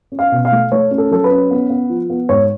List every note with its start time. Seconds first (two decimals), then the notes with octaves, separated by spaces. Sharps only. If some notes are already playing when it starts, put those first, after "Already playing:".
0.12 C#4
0.19 F5
0.32 B2
0.45 F5
0.52 A3
0.72 A3 C#5
0.91 C#4
0.98 A4
1.11 F#3 A4
1.24 B4
1.31 C#4
1.51 B3
1.70 B3
1.89 F3
2.10 B3
2.29 G#2 C#5